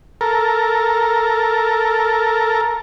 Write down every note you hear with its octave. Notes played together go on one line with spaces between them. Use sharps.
A4 A#4